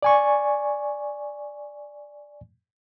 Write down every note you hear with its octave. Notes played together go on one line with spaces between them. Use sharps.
D5 G#5 C#6